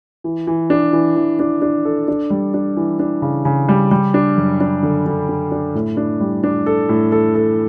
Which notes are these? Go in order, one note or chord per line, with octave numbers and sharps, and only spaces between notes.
E3
E3
D4
E3
E3
D4
D4
A4
D4
G3
D4
E3
D4
C#3
C#3
G3
G3
D4
F#2
D4
D3
D3
D4
D4
A2
D4
G3
D4
A4
A2
A4
A4